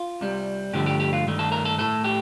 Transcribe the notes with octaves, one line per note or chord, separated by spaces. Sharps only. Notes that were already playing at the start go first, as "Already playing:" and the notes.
Already playing: F4
C2 C3 G3
G2 D3 F3 A3 G4
G4
G4
F4
G2 D#3 A3
A4
A#4
A4
A2 A3 A4
G4